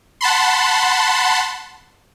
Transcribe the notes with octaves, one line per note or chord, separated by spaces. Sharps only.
F#5 A5 B5 C6